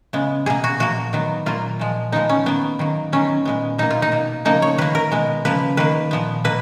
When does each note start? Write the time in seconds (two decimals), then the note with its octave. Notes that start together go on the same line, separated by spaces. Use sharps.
0.13 C#3 G#3 B3
0.46 B2 A#3 G#4
0.64 F#4
0.80 A#2 F3 A#3 F#4
1.13 D#3 F#3 B3
1.46 A#2 F#3 A#3 F4
1.79 A#2 F3 G#3
2.12 A#2 F3 G#3 B3 D#4
2.29 C#4
2.46 D#3 A#3 B3
2.79 D#3 F#3 A#3
3.12 D#3 F#3 B3 C#4
3.45 A#2 G#3 B3
3.78 B2 A#3 D#4
3.91 F4
4.02 D#4
4.12 B2 A#3
4.45 C#3 F3 A#3 D#4
4.62 C#5
4.78 D#3 A#3 B4
4.95 A#4
5.12 B2 G#3 B3
5.45 C#3 F3 A#3 B4
5.77 D#3 A#3 B4
6.11 A#2 F3 B3
6.44 B2 A#3 B4